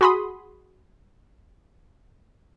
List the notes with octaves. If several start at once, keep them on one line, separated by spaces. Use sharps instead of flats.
F#4 G#4 B5 C6 D#6